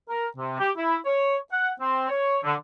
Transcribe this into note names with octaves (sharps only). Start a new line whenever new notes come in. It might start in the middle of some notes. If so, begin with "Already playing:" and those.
A#4
C3
G4
E4
C#5
F#5
C4
C#5
D3